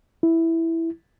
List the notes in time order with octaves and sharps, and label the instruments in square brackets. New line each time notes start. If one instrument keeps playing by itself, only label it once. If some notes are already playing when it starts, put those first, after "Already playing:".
[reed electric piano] E4